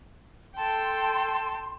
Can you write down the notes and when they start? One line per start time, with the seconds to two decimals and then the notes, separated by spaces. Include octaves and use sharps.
0.57 A4 G5 A5 C6